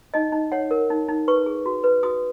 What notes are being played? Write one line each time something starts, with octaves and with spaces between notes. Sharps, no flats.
D#4 D#5
D#4
C#5 F#5
A#4
D#4
D#4
B4 C#6
G#4
F#4
B4
F#4 D#6